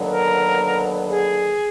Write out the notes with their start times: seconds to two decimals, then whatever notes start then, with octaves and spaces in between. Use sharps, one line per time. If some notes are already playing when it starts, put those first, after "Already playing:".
Already playing: D#2 D3 F#3 B3
0.10 A#4
1.09 G#4